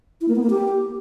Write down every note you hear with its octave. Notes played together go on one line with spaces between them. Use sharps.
E4
A#3
B3
A#3
G4